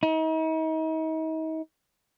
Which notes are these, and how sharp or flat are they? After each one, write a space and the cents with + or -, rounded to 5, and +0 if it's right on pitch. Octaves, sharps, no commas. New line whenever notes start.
D#4 +40